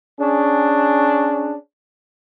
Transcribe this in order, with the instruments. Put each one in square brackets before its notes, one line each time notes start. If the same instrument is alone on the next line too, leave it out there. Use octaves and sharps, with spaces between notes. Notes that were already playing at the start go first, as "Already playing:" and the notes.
[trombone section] C#4 D4 G#4